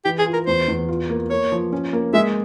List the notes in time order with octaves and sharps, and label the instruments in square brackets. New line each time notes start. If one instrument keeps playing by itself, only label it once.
[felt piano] E3 [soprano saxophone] G4
[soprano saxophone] G#4
[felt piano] F4
[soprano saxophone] A#4
[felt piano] E2 [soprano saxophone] C5
[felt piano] E2
F4
A#3
[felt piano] A#3 [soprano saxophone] C#5
[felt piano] F3
C#4
A#3
[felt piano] G#3 [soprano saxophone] E5